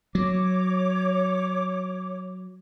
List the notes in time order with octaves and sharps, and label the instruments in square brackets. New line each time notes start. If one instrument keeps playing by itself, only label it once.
[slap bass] F#3 [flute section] C#5 D6